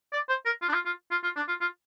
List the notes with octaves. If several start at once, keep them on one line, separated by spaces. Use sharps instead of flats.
D5
C5
A#4
F4
D4
F4
F4
F4
F4
D4
F4
F4